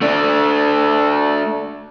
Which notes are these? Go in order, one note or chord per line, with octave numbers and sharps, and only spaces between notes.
A3 D4